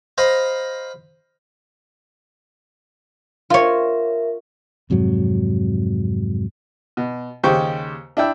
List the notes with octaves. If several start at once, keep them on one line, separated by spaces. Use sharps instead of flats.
C5 D#5 F5 A#5 B5
F4 A#4 C#5 E5
F2 G#2 C3 F#3
B2
D#2 C#3 G4 C5 C#6
D4 E4 G5